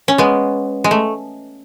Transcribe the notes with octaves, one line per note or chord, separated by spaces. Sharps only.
C#4
G#3 B3
G#3
A3